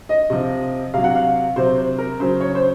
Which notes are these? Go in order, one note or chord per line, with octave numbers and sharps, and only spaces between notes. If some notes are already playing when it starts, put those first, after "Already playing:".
D#5
C3 F3
C3 F#3 F5
F#5
F5
C3 F#3 C5
C5
A#4
C#3 F#3 C5
C#5
C5